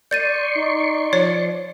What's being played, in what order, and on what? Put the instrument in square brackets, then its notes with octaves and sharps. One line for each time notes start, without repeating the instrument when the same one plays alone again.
[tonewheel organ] D5 C6 C#6 [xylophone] G6 A6 D#7
[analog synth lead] D#4
[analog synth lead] F3 [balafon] C#5 [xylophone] A6